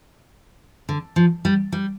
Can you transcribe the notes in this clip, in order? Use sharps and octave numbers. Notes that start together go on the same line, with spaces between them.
D3
F3
G3
G3